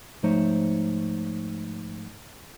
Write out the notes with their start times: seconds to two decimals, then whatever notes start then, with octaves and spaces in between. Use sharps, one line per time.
0.23 G#2 F3 A3 D#4 C5 C#5